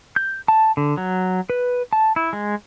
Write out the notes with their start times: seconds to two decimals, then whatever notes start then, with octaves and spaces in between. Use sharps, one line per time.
0.16 G6
0.48 A5
0.77 D3
0.97 F#3
1.50 B4
1.93 A5
2.16 E4
2.33 G#3